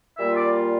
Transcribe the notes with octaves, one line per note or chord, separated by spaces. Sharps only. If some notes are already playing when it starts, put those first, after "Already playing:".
A#2 G3 A#3 F4 E5
D5